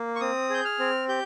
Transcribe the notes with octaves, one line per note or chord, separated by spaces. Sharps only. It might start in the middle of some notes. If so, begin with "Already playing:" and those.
Already playing: A#3
C#6
C4 D#6
G#4 G6
F6
C4
G4 G6